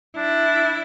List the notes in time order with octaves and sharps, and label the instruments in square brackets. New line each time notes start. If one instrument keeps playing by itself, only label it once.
[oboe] D4 [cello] E4